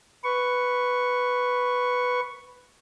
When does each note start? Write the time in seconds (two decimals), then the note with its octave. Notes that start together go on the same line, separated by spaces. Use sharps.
0.24 B4 C#6